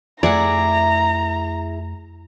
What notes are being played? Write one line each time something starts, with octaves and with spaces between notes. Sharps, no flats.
F2 A3 E4 G#4 D5 F#5 A#5